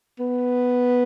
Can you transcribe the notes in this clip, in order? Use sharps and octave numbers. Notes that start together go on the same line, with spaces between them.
B3